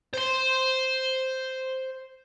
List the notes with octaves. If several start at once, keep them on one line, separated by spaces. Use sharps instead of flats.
C5 C6